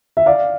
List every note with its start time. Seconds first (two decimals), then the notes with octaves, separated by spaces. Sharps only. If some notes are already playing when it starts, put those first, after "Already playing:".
0.17 E5
0.26 D5 F5